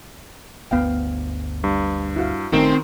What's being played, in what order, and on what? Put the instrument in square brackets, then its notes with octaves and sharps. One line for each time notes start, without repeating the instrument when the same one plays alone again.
[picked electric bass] G1 D2 [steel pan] B3 F5 G5
[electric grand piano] G2
[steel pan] E4 F#4 F5
[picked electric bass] A#1 A3 C#4 [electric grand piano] D#3 [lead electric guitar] C4